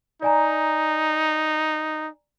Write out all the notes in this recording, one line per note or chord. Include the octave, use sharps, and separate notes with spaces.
D#4 D5 G#5 A#5